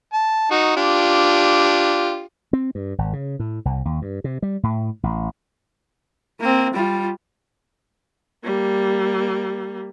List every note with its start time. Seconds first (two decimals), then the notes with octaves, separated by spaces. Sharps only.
0.13 A5
0.51 D#4 F#4
0.77 D4 F4 G4
2.53 C4
2.75 G2
2.98 G#1
3.13 C#3
3.39 A2
3.65 C2
3.85 D#2
4.02 G2
4.24 C3
4.42 G3
4.63 A2
5.03 A1
6.41 A#3 C4
6.74 G3 F4
8.44 G3 A#3